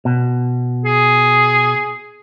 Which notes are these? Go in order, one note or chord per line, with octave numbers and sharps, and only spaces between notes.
B2
G#4